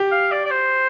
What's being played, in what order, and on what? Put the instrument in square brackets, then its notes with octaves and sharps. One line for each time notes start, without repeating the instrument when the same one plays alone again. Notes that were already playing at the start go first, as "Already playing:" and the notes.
Already playing: [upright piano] G4
[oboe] F5
D5
D5
C5